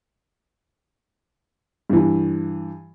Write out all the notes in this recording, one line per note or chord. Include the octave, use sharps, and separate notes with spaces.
G2 E3